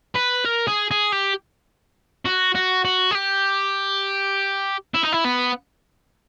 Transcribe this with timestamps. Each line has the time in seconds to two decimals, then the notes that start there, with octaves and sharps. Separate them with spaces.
0.16 B4
0.45 A#4
0.67 G#4
0.91 G#4
1.12 G4
2.25 F#4
2.55 F#4
2.85 F#4
3.11 G#4
3.15 G4
4.94 E4
5.03 D#4
5.12 E4
5.24 B3